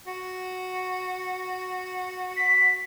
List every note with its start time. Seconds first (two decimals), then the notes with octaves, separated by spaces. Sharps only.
0.07 F#4
2.36 B6